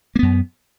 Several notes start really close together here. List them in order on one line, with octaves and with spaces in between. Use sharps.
A#3 B3 F#2